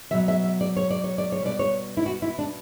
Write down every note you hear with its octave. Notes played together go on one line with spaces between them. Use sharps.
B2 F#3 E5
E5
E5
D5
C#5
D5
C#5
D5
C#5
B2 G3 D5
C#5
E4
F#4
E4
D4